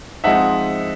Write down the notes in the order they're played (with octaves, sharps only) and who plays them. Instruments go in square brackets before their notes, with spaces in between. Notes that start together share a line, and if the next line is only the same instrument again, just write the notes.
[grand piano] F3 G#3 C4 D#4 E5 F#5